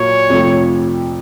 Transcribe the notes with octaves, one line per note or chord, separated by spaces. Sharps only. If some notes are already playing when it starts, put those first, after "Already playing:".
Already playing: A#2 F#3 A#3 C#5
F2 C3 F3 A3